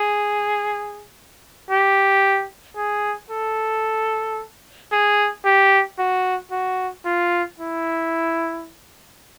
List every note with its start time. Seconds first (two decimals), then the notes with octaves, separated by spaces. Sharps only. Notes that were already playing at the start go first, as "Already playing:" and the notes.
Already playing: G#4
1.70 G4
2.77 G#4
3.30 A4
4.92 G#4
5.45 G4
5.99 F#4
6.51 F#4
7.05 F4
7.59 E4